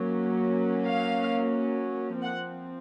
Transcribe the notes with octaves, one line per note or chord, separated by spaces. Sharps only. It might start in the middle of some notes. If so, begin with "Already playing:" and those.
Already playing: F#3 A#3 C#4
F5
F3 C4 F#5